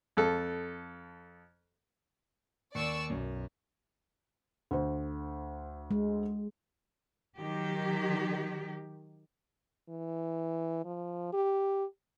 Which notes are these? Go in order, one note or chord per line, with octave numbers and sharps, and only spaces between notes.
F2 A4
D#2 D5 C#6 E6
B1 F#2
D2 C5
G#3
D#3 F#3 G4
E3
F3
G4